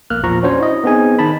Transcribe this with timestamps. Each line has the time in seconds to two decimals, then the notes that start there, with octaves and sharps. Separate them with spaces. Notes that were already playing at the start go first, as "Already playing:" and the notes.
0.10 A#1 A#3 F6 F#6
0.23 E2 A#2 F3 A#5 C#6
0.43 C#4 D4 F#4 C5 C#5
0.60 E4 D#5
0.84 B3 C4 D#4 G#4 G#5
1.19 D#3 D#4 A5 B5